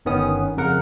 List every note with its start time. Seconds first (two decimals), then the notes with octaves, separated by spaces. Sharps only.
0.05 G1 D#3 B3 C#4 D#6
0.57 F2 C#3 A#4 F#5